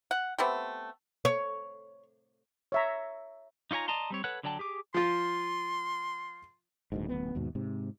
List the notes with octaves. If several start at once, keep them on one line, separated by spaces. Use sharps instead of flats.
F#5
A3 B3 C4 G4
C#5
C#5 E5 A#5
D#4 F4 C#5 G#5 A#5
D5 D#5 A5 A#5 C6
G3 C4 C#5
A4 B4 C#5 F#5 F#6
D3 F#3 D5 G5 A5
G4 G#4 D6
F3 F4 C6
D#1 D2 G#2
D1 A1 B3
D#2 G#2 B2
G#2 C3